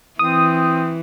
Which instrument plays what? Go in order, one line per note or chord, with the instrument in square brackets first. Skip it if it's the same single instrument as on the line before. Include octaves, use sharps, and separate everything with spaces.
[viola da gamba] E3 [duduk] C4 [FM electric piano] D#6